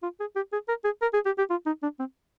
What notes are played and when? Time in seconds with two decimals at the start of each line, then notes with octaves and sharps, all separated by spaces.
0.03 F4
0.20 G#4
0.36 G4
0.53 G#4
0.68 A#4
0.85 G#4
1.02 A#4
1.14 G#4
1.26 G4
1.38 G4
1.50 F4
1.66 D#4
1.83 D4
1.99 C4